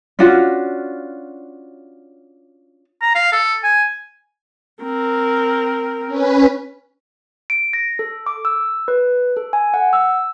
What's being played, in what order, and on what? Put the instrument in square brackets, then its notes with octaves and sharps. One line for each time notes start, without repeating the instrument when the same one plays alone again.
[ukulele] C#4 D4 F4 F#4
[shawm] A#5
F5
A4
G#5
[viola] C4 A#4
[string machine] C#4 B4
[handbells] D7
A#6
A4
D6
E6
B4
A4
G#5
F#5
E6